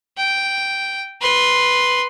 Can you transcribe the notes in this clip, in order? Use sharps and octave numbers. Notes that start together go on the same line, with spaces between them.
G5
B4 C6